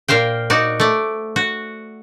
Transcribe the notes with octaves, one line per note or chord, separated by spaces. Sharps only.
A#2 A#4 C5 F5 G5
D#4 F#4 D5
A3 D5
F#4